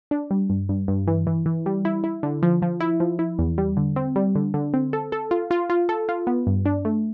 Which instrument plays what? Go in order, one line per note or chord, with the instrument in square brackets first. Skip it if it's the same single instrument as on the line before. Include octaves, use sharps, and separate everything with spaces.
[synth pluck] D4
G3
G2
G2
G2
E3
E3
E3
G3
E4
E4
D3
F3
F3
E4
F3
E4
E2
G3
D3
C4
G3
D3
D3
C4
A4
A4
F4
F4
F4
A4
F4
B3
G2
D4
A3